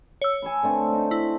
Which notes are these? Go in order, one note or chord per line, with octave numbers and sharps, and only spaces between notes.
C#5 E6
G#5 A5 B5
D3 A3 C4
D#4
E4